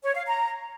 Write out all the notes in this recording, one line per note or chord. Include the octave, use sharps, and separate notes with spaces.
C#5
F5
A#5